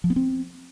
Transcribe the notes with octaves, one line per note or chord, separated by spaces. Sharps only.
F3
B3
C4